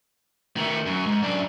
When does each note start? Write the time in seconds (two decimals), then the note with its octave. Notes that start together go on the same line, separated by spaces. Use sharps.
0.56 D#3 A3
0.86 F#2
1.06 G#2
1.22 F#2 D4